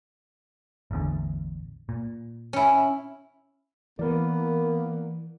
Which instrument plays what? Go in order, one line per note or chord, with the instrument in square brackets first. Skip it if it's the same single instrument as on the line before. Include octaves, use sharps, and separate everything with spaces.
[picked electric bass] A1 E2 D3
A#2
[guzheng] C#4 E4
[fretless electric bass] E3 [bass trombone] A#3 [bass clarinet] B3 [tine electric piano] A#4 D5